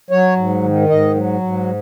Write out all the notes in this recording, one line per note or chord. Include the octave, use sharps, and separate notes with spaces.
F#3 C#5
G#2
D#3
G#2 D#5
F#3
G#2